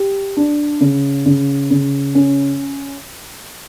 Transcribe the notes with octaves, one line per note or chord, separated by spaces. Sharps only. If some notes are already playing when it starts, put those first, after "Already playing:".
Already playing: G4
D4
C#3
C#3
C#3
C#4